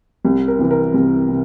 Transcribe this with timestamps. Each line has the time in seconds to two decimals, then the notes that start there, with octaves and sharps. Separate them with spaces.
0.25 C2
0.48 A#4
0.59 C3 E3
0.71 A#4
0.94 C2
1.29 C3